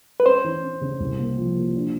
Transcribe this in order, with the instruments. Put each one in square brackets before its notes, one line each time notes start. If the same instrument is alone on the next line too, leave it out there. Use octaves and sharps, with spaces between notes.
[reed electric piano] B4
[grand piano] C#4 [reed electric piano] C5
[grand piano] E3
C#4
C#3
C2
A#3
F3
A#3
D4